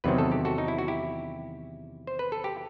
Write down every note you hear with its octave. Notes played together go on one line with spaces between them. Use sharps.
E2 C3 D#3 F#3 C4 B4
A4
G4
F#4 A4
D#4
E4
F#4
E4 G4
C5
B4
A4
G4